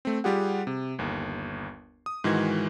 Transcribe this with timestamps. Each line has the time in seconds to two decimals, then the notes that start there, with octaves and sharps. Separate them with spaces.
0.05 A3 C4
0.24 G3 F4 G4 G#4 F#5
0.67 C3
0.99 G1 D#2
2.06 D#6
2.24 G#2 D#3 E3 G#3 F#4 G#6